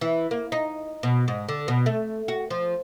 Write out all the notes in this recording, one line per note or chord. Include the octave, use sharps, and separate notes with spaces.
E3
A#3
D#4
B2
G#2
D3
B2
A3
F#4
F3